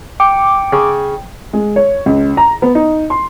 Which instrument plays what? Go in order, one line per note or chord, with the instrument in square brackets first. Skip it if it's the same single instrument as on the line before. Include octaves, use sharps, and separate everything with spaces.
[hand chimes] G5 [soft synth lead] D6
[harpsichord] C#3
[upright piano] G#3
C#5
C#2
A#5
B3
D#4
C6